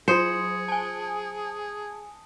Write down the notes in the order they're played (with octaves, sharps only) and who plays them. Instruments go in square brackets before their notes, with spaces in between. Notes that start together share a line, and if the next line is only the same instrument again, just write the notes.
[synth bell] F#3 F4 C6 [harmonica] G#4 [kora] C5 [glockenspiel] D#6 C#7
[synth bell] G#5 A5